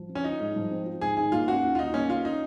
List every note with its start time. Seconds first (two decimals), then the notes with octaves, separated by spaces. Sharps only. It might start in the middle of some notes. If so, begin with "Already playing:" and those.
Already playing: F3
0.09 C4
0.15 C#4
0.24 D#4 F4
0.40 G#2
0.56 F3
0.71 C4
0.86 F4
1.01 G#2 G#4
1.17 D#3 G#4
1.32 A#3 F4
1.48 C#4 F#4
1.63 D#2
1.75 F4
1.78 D#3 D#4
1.94 A#3 C#4
2.09 C#4 F4
2.25 D#4